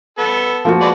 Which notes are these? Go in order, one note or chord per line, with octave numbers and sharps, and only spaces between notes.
B3 A4
F3 A#3 F#4
G#3 B4 D5